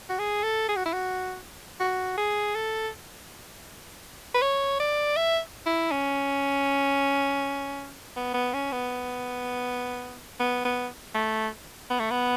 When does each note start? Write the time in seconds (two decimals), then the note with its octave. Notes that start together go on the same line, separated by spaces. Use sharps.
0.09 F#4
0.19 G#4
0.43 A4
0.69 G#4
0.76 F#4
0.85 E4
0.93 F#4
1.80 F#4
2.18 G#4
2.55 A4
4.34 B4
4.42 C#5
4.80 D5
5.17 E5
5.66 E4
5.92 C#4
8.16 B3
8.34 B3
8.53 C#4
8.72 B3
10.40 B3
10.65 B3
11.14 A3
11.90 B3
12.00 A3
12.11 B3